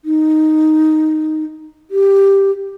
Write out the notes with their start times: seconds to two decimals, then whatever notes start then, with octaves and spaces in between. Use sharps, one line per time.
0.05 D#4
1.91 G4